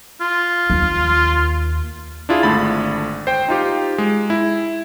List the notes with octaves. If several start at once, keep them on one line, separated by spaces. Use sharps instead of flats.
F4
D#2
D4 E4 F4 G#4
G#1 D3 A3 B5 A6
C5 G5
D#4 F4 G4
G#3
E4